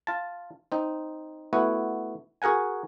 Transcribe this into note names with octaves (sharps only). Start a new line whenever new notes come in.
F4 A5
C4 D#4
A3 B3 E4 F#4
F#4 G#4 A#4 F#5 G#5